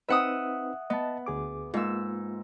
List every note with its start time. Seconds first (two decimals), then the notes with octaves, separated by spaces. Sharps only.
0.09 C4 D#4 B4 E5 F#5 D#6
0.90 B3 D#5 A5
1.26 D2 G#4 D6
1.74 G#2 A#3 F4 E6